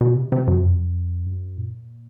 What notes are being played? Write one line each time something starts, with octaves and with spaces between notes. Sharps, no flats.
B2
C3
C3
F#2
F2
F#2
A#2